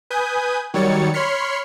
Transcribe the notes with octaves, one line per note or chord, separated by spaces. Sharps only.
B4 G#5 D#6 G6
D#3 F#3 G3 C#5 A6 C#7
C#5 B5 C6 F6 B6 C#7